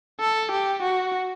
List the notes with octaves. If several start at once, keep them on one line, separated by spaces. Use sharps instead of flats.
A4
G4
F#4